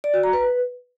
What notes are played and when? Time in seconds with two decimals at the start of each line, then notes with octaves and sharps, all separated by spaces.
0.04 D5
0.14 F#4
0.23 A#5
0.33 B4